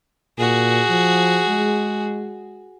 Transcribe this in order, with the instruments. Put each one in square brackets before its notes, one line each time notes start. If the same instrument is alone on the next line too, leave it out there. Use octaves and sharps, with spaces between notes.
[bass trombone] A#2 [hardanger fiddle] F#4 G#4
[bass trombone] F3
G#3